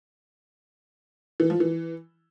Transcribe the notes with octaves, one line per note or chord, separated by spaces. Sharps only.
E3
F3
E3